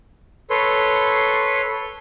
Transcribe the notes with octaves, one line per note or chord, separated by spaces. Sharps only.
A4 B4 C#5 C6